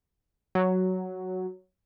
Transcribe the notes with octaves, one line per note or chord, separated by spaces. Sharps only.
F#3